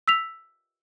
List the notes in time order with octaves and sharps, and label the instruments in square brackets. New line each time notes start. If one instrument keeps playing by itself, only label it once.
[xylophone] E6 B6 F7